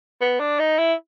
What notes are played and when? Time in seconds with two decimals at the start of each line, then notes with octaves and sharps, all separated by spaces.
0.21 B3
0.40 D4
0.59 D#4
0.78 E4